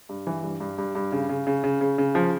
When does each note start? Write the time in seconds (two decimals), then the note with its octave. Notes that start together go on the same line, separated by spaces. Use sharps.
0.09 G2
0.27 E3
0.43 G2
0.60 G2
0.78 G2
0.95 G2
1.12 C#3
1.29 C#3
1.47 C#3
1.64 C#3
1.81 C#3
1.98 C#3
2.15 F3